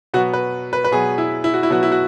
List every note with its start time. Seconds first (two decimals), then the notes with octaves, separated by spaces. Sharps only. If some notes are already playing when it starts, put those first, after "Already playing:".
0.14 B2 F#3 B3 F#4
0.33 B4
0.73 B4
0.84 B4
0.92 B2 F#3 B3 G#4
1.18 E4
1.44 E4
1.54 F#4
1.63 E4
1.70 B2 F#3 B3 F#4
1.83 E4
1.92 F#4